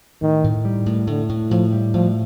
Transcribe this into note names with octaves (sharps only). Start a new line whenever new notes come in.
A2 D#3
A2
G3
A2
A2 D3
A2
A2 F3
G3
A2 F3